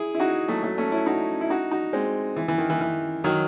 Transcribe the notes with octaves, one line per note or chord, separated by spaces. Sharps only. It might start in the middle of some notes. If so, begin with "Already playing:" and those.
Already playing: E4 G#4
E4
D#4 F#4
F#3 A3
F#3 A3
A3 C#4
C#4 E4
D#4 F#4
E4
D#4 F#4
D#4 F#4
G#3 C4
E3
E3
D#3
E3
E3
D#3 F#3